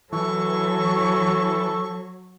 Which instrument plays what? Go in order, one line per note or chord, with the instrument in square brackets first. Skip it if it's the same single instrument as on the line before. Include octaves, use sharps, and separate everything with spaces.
[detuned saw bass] E3 [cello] F#3 [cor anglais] A4 [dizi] C#6